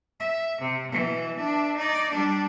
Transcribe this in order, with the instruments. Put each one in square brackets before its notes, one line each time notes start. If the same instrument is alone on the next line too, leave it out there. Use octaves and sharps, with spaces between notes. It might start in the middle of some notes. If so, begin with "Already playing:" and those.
[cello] E5
C3
B2 E3
D4 E5
D#4 D5
G3 D4